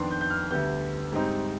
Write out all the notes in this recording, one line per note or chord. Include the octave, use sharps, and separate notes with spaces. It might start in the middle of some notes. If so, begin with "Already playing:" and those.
Already playing: F2 D#3 B3 D4 C6
G6
G6
F6
D2 D3 G3 B3 G6
G#2 G3 C4 D#4